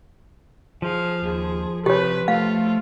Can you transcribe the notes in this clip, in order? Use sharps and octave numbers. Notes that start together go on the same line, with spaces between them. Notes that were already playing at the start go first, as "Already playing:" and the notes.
F3 G#4 F5
D#2 G#4
C3 G4 B4 C#5
A3 F4 F5